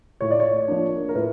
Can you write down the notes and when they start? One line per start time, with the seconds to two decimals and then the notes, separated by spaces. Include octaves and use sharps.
0.21 A2 C#5
0.31 D5
0.40 C#5
0.68 F3 A#3 D4
1.09 A#4
1.15 A2 B4